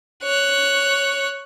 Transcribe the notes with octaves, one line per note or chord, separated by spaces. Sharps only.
C#5 F#6